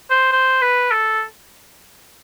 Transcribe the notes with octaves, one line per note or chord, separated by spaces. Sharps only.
C5
C5
B4
A4